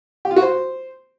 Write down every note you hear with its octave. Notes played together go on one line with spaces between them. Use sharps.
G4
F4
F#4
C5